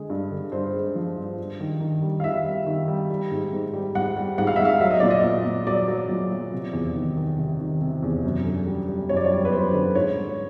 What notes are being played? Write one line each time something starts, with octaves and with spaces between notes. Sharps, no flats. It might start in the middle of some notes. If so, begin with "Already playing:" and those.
Already playing: D3 G#3 G#4
G2
D3
G2 C5
G#3
F3
G2
G2
D#3
D#3
G3
F5
D#3 E5
G3
D#3
G3
G3
G#2
G#2
G3
G#2 F#5
G3
G#2 F#5
F5
G#2 E5
F5
F#3 E5
D#5
A#2 D5
D#5
A#2
A#2
F#3 D5
F#3
A#2
F#3
C3
E2
D#3
D#3
C3
D#3
C3
E2
F#2
D3
G3
G3
F#2 C#5
D5
C#5
G3
B4
F#2 C5
D3
G#2 C#5
G#2